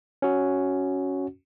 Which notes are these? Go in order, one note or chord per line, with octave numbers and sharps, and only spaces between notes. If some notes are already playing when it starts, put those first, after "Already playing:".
C#4 F#4